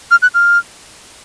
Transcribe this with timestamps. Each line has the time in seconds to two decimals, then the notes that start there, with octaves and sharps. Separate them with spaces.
0.11 F6
0.22 F#6
0.34 F6